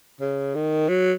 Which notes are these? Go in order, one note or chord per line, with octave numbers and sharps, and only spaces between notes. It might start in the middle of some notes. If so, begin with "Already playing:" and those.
C#3
D#3
F#3